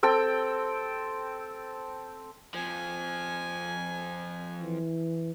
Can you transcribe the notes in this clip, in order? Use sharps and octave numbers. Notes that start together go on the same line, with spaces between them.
C4 A4 G5
F2 F3 G#5
E3